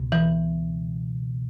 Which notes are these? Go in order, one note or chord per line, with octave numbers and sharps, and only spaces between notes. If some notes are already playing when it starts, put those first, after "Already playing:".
Already playing: C#2 B2
E3